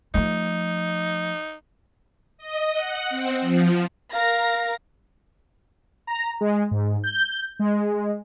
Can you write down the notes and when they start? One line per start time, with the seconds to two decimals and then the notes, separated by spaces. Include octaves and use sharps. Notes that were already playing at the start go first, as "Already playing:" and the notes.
0.14 F3 A3 D#4
2.38 D#5
2.73 F#5
3.10 C4
3.41 F3
4.13 A#4 F5 A#6
6.07 A#5
6.41 G#3
6.71 G#2
7.04 G6
7.59 G#3